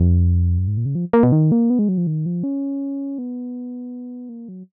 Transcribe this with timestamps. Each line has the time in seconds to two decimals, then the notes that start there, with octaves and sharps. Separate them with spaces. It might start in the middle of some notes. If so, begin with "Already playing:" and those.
Already playing: F2
0.58 F#2
0.67 G#2
0.77 A#2
0.86 C#3
0.95 F3
1.13 A#3
1.23 B2
1.32 D#3
1.52 A#3
1.70 B3
1.79 G#3
1.89 F#3
1.98 F3
2.07 D#3
2.26 F3
2.43 C#4
3.18 B3
4.29 A#3
4.49 F#3